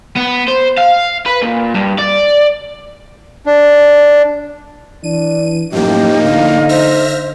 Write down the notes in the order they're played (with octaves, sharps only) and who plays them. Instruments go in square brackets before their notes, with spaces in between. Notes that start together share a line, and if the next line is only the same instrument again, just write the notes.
[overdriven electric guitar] B3
C5
F5
B4
A#2
G2
D5
[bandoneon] D4
[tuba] E3 [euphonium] D4 [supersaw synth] D#7
[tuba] F#2 [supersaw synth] A2 F3 A#3 [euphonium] D#4 [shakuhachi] G4
[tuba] D3 [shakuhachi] F5
[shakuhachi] C5 [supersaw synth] E5 F6 A#6